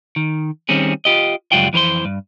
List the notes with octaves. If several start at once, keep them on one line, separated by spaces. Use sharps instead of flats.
D#3
D#3 G3 C4 C#4 G#4
F4 G4 D#5
C#2 F#2 G3 F4 F#4 G5
F2 E3 A#4 C5 C6
G2